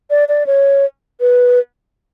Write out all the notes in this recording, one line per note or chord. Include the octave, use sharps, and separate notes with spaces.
D5
D5
C#5
B4